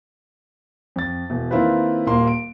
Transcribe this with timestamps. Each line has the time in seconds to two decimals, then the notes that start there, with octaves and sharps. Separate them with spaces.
0.96 F2 A6
1.30 E1
1.51 D#3 A#3 C4 E4 F4 B4
2.07 D#1 A#3 C6
2.27 D7